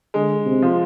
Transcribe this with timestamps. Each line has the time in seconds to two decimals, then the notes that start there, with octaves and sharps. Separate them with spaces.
0.14 D3 G#3
0.45 C3
0.62 F3